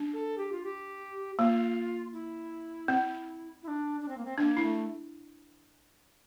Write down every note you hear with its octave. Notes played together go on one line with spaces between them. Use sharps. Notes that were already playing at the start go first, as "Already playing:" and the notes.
Already playing: D4
A4
G4
F4
G4
A#3 F4
E4
C4
E4
D4
D4
C4
A#3
C4
A#3 C4 D4
E4
A3